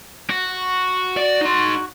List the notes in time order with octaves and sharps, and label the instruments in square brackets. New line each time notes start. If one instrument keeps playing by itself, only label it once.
[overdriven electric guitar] F#4
[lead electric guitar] D5
D#4 C6